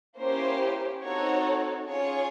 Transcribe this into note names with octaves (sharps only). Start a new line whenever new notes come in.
A#3 C#4 E4 G4 C5
C4 D#4 F#4 A4 C#5
C#4 F4 G#4 C#5